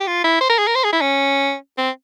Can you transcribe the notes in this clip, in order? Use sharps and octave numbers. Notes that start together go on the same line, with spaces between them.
G4
F4
E4
C5
A#4
G#4
A#4
C5
G#4
E4
C#4
C4